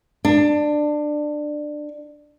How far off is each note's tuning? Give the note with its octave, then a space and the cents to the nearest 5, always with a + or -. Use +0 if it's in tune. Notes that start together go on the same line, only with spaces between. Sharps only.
D4 +20